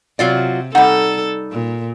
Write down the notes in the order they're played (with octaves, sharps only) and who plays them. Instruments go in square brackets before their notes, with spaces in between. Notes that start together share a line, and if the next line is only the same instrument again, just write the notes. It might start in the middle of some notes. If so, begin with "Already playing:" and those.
[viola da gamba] C3 [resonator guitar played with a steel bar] F#3 F4 D5
[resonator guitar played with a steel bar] G3 D#4 [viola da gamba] A4 [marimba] F#5
[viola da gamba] A#2